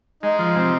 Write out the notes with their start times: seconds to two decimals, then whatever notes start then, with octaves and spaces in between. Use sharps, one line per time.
0.23 G#3 D#4
0.39 F3
0.56 C3